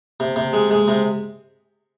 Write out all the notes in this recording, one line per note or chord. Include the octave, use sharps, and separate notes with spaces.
C3
C3
G#3
G#3
C3